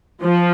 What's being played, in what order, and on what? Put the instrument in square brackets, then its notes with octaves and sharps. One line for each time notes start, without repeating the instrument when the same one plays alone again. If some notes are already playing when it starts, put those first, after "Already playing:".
[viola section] F3